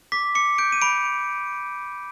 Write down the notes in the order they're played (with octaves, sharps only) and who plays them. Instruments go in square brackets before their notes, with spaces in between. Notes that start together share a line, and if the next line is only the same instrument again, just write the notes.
[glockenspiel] D6 B6
D6 C#7
G6 D7
D#7
B5 D7